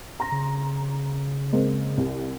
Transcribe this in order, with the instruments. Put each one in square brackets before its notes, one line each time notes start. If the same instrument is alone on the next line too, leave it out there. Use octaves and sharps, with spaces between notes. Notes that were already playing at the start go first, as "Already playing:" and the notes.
[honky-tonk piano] A#5 C6 A#6
[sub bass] C#3
[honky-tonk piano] G#3 A#3 C4
C2